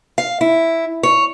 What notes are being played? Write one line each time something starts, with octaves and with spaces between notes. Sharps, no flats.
F5
E4
C#5